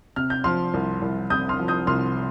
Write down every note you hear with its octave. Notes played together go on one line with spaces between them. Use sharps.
C3 F6
G6
F3 C6 F6
C2
C2
C3 D#6 G6
C6 F6
F3
D#6 G6
C2 C6 F6